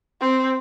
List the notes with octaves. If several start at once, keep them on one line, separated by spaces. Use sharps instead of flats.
C4